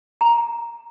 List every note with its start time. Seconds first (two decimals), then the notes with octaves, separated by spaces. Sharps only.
0.21 A#5